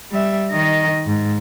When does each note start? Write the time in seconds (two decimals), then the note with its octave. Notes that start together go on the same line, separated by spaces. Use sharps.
0.12 G3 E5
0.51 D#3 D#5
1.07 G#2